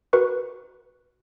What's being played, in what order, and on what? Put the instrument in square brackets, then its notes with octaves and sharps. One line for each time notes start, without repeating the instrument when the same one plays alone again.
[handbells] F#4 A#4 B4 C#6 F#6